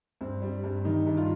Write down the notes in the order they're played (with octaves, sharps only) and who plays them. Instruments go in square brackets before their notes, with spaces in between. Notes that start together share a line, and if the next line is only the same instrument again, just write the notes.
[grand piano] G2 C4
G3
G2
D#3 D#4
G2
F4